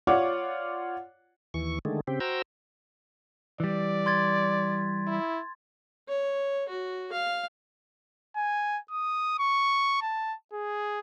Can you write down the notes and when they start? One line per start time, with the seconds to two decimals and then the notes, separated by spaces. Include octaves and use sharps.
0.07 F4 C#5 D5 F#5 D6
1.54 D#2 E3 C#6
1.85 D3 D#3 G#3 A3
2.07 C#3 C4 G4
2.20 F#4 C5 G5 A#5 E6
3.60 E3 G3 D5
4.06 C6 G#6 A6
5.07 E4
6.09 C#5
6.69 F#4
7.12 F5
8.36 G#5
8.91 D#6
9.39 C#6
10.02 A5
10.53 G#4